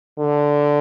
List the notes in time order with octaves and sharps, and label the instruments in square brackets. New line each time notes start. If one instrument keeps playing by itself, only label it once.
[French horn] D3